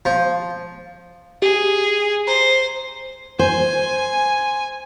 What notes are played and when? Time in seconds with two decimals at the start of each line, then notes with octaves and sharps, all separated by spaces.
0.05 F3
1.42 G4 G#4
2.28 C5 A#5
3.39 C5 G#5